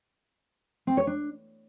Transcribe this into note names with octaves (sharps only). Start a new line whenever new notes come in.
C4
C#5
D4